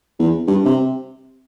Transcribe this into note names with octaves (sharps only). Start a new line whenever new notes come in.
E2
G2
C3